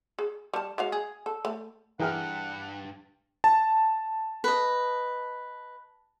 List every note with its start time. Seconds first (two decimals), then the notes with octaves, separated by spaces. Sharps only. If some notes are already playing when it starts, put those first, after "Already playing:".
0.19 G#4
0.54 G3 A5
0.78 G#3 F#4 F5
0.92 G#4
1.26 A4
1.45 A3
2.00 G2 E3 G#4 A#4 F#5 G5 F6
3.44 A5
4.44 B4 D#5